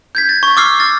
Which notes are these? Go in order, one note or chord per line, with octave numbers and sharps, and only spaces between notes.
G6 G#6 B6
A6
C#6
D6 E6 F6 C7
A6